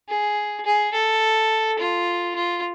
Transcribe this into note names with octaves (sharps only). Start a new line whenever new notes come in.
G#4
G#4
A4
F4
F4